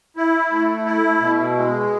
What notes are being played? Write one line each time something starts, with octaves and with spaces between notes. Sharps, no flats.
E4
A3
E4
B2
G#3